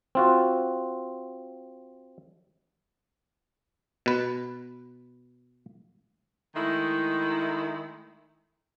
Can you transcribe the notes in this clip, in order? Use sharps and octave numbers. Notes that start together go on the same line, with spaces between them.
C4 F4 F#4
B2 B4
D#3 G#3 A3 E4